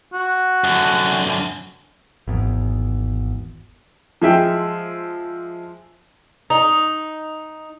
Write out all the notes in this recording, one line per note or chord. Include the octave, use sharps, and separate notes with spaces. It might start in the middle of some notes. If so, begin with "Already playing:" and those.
F#4
F#2 D3
G#1 E2
F3 G#3 E5 G5
D#4